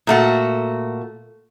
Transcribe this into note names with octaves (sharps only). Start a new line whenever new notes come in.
A#2 A3 F#4